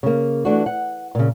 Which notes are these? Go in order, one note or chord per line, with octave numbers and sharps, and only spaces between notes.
C#3 A#3
E3 A3 D4 F#4
F#5
A#2 C#3